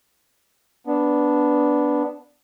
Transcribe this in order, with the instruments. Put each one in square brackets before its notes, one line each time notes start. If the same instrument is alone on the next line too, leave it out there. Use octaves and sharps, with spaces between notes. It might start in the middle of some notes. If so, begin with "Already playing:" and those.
[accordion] B3 D4